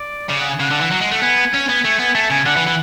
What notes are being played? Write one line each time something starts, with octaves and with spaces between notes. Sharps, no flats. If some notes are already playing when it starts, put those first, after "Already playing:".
Already playing: D5
C#3 D5
F#5
G#5
C#3 F#5
D3
E3
F#3
G#3
A3
B3 G#5
C#4
B3
A3
B3
A3 A5
C#3 G#5
D3 F#5
E3
E3